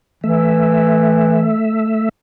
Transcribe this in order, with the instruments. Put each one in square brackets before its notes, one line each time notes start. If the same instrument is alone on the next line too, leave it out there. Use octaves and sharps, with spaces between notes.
[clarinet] E3 [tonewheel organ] A3 E5